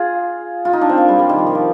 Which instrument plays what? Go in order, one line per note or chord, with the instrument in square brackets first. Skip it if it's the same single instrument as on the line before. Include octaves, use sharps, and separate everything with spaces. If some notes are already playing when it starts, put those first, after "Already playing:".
Already playing: [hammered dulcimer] F4 G#4
F4
D#4
D4
C4
A#3
G3
G3
D#3
F3
D#3
F3